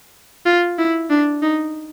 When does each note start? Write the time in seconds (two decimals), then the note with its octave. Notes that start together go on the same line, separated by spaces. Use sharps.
0.46 F4
0.78 E4
1.10 D4
1.42 D#4